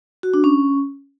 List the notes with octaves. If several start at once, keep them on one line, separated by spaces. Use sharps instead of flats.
F#4
D4
C#4